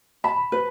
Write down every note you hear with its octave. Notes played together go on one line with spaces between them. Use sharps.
A5 B5
B4